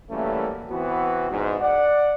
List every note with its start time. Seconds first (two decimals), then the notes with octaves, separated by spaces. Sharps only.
0.11 F#2 E3 G3 A3 A#3 C#4
0.69 E3 B3 C4 F#4
1.30 E2 G#2
1.61 D5 F#5